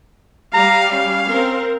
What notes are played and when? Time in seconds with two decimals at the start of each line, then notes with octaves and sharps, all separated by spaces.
0.54 G3 F5 A#5
0.92 C#4 F5
1.28 C4 A#4